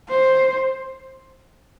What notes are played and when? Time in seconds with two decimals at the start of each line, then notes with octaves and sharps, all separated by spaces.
0.09 C5